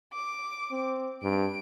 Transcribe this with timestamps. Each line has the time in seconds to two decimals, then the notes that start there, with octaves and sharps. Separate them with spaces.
0.13 D6
0.71 C4
1.23 G2 D7